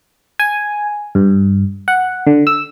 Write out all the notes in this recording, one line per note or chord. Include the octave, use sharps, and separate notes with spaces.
G#5
G2
F#5
D3
E6